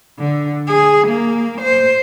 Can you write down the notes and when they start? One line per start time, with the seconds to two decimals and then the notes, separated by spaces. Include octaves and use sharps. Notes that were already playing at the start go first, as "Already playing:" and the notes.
0.19 D3
0.68 G#4
1.08 A#3
1.61 C5